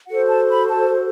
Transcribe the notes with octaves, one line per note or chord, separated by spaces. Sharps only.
F#4 A4 C5 F#5
A5
B5
A5